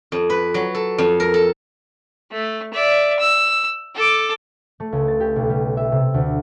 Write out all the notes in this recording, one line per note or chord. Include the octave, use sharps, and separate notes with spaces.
F2
B4
F#3
A4
F2
A#4
A4
A3
D5 E5
E6
A4 D6
A3
C#2
A6
G4
B1
G3
E5
C3
D2